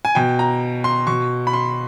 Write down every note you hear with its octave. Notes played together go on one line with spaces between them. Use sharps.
G#5
B2 G5
A#5
C6
B2 C#6
B5
C6